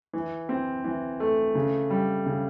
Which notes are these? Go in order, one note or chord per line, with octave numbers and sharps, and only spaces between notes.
E3
C4
E3
A3
C#3
G3
C#3